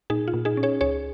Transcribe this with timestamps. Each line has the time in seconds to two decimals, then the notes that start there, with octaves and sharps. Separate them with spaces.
0.10 A#2 D#4 G#4
0.28 F4
0.34 A#2
0.45 D#4 G#4
0.57 C#4
0.63 G#4 C#5
0.81 C#2 G#4 C#5